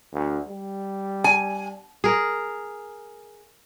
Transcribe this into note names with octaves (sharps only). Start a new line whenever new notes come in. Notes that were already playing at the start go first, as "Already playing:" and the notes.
D2
G3
G#5
G#4 A#4